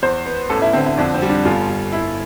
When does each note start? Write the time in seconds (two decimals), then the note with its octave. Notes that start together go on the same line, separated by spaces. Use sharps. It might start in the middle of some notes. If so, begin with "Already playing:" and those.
0.02 E2 C5
0.26 B3
0.50 A1 A4
0.62 E4
0.73 D3 C4
0.86 E4
0.98 F2 D4
1.14 C4
1.22 G3
1.29 D4
1.45 G1 F4
1.70 G1
1.93 E4